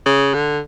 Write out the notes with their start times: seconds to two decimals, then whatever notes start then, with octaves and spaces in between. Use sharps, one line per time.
0.05 C#3
0.34 D3